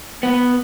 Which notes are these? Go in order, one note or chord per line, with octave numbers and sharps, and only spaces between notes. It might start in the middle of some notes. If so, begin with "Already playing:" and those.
B3